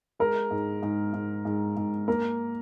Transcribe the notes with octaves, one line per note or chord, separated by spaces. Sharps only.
G#3 A#4
G#2
G#2
G#2
G#2
G#2
A#3 A#4